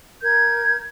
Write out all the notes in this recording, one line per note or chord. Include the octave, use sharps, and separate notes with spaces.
A#4 G6 G#6